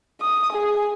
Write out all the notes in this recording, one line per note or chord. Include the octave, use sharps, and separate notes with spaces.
D#6
G#4